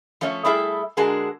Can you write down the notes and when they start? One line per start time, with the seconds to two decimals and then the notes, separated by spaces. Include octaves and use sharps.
0.21 F3 A3 C#4 C#5 E5
0.45 G3 A3 E4 G#4 A4 E5
0.97 D3 G#3 F#4 G#4 A#4 A5